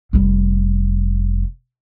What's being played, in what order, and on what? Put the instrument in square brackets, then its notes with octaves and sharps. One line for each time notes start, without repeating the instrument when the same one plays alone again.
[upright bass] F1 G3